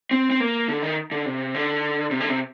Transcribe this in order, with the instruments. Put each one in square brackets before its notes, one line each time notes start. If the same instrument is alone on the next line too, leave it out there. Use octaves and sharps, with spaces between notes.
[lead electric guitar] C4
C4
A#3
D3
D#3
D3
C3
D3
C3
D3
C3